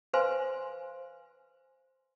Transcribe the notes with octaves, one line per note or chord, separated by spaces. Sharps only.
B4 C5 F5 G#5 C6